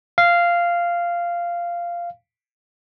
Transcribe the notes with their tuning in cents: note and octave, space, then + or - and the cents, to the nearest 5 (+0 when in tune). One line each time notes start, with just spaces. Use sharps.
F5 -10